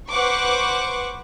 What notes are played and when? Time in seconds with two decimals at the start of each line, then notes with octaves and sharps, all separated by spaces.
0.11 B4 C5 F#5 C#6 D6